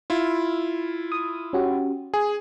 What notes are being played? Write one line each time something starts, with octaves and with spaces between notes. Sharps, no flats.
E4 F4
D#6
C#4 F#4 G4
G#4 G#5